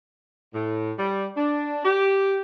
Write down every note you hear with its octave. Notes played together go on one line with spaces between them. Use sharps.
A2
G3
D4
G4